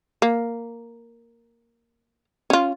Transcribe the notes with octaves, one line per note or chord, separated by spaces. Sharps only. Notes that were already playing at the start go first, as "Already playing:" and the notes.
A#3
C#4 F4